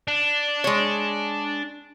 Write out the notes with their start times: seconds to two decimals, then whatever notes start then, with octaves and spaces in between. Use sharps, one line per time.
0.08 D4
0.64 G#3 C#5